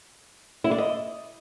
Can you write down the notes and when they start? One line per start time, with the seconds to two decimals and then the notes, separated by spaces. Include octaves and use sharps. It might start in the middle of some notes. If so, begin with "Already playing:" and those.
0.64 E4
0.71 D5
0.78 D#5